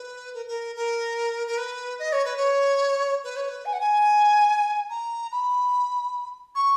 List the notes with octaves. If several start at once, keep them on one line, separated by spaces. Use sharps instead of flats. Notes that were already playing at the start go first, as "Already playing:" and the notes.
Already playing: B4
A#4
A#4
A#4
A#4
B4
D#5
C#5
B4
C#5
B4
C#5
B4
G#5
F#5
G#5
A#5
B5
C#6